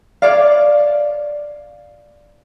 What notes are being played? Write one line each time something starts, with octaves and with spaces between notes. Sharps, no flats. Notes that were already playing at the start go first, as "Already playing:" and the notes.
C#5 D5 F5